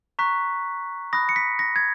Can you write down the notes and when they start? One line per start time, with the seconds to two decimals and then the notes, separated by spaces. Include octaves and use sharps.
0.19 A#5 C#6 F#6 B6
1.13 B5 D#6 F#6 A#6
1.29 C#7
1.36 B6
1.59 A#6
1.76 G#6